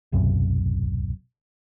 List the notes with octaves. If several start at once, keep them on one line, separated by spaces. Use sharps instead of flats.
D1 B1 F#2 C3